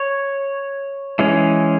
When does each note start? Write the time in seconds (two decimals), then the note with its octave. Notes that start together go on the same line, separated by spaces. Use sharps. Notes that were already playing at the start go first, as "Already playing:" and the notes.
Already playing: C#5
1.19 E3 G#3 C#4